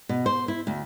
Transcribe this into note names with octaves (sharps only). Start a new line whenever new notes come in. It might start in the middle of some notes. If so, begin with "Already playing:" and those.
B2
C5
E4
D2